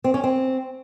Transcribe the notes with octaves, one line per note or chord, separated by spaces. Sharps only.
C4
C#4
C4